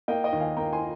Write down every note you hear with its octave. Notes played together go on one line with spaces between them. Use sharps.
A#3 D#5 G5
D#5 G5
D#2
F5 G#5
A#3 G5 A#5
G#5 C6